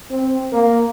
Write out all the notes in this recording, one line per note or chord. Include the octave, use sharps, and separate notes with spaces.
C4
A#3